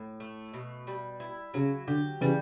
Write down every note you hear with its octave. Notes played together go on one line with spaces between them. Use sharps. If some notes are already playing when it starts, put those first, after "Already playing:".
Already playing: A2
A3
B2
G3
E4
C#3 F#3
D3 G4
C#3 E3 G3